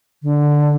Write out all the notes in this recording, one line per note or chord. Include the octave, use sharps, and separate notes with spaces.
D3